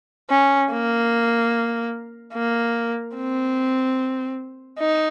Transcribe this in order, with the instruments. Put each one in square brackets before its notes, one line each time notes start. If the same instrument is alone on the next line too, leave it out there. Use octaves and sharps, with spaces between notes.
[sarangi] C#4
A#3
A#3
C4
D#4